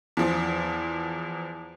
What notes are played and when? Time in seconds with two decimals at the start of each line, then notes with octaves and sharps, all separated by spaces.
0.17 E2 F3